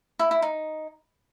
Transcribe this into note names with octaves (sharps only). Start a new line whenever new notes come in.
E4
E4
D#4